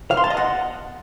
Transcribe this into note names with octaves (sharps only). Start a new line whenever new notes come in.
F5
C6
A5
D#5
F#5